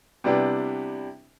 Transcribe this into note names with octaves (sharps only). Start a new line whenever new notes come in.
C3 G3 B3 D4 E4 G4